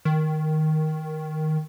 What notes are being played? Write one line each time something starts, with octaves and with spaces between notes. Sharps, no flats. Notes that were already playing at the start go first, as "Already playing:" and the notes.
D#3